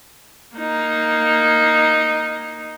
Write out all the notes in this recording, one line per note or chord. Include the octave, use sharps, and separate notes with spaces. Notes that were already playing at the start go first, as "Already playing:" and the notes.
A#3 D#4